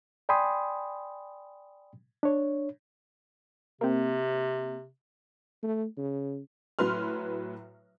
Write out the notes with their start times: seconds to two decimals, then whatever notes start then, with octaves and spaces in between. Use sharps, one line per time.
0.29 D5 G5 G#5 B5 C6 D#6
2.23 D4 C#5
3.81 C3 A#3 C4
5.63 A3
5.97 C#3
6.79 A2 F#3 B4 C6 F6